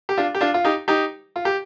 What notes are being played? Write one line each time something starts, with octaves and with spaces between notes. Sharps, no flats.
G4
D4 F4
G4
D4 F4
F4
D#4 G4
D#4 G4
F4
G4